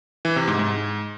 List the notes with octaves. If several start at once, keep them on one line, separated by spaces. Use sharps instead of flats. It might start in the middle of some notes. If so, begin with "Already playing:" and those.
E3
C3
G#2
G#2